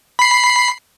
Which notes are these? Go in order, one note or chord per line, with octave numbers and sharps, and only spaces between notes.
B5 C7